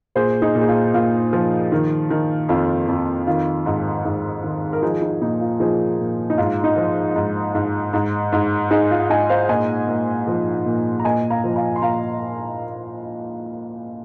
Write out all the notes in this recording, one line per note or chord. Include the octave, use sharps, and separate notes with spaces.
A#2 G#4 C5
D#4 G#4
A#2
G#4
F4
A#2 F4
F3
D#3
D#3
F2 F4
F2
D#3 F4
G#2
G#2
D#3
A#4
F3 D#4 G#4
D#4
A#2 D#4
F4
F3 D#4 G#4
A#2
D#4
G#2 F4
D#4
F3
G#2
G#2
G#2
G#2
G#2 D#4 G#4
F4
G#2 D#5 G#5
C5 F5
A#2 D#5 G#5
A#2
F3
A#2
A#5
A#2 D#5 G#5
F5 A#5
F3
F5 A#5
C6
A#2 F5 A#5